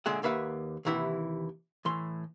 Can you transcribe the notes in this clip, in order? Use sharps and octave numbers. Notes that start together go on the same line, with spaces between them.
A#2 D3 G#3 G#4 E5 F#5
D#2 A#3 B4 E5 F#5
D#2 C3 E3 E4 F#5
A2 E3 C6